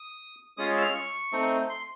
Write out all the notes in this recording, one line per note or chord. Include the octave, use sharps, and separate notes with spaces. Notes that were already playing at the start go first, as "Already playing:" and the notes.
Already playing: D#6
G#3 C#4 F4 G#4 D#6
E6
F6
C#6
A3 C4 D#4
C6